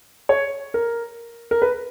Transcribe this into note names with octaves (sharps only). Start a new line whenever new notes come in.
C#5
A#4
A#4
B4